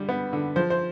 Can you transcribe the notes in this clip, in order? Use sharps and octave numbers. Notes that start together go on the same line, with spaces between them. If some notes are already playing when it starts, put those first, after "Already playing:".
Already playing: D3 G3
B3
D3
F3 C5
C5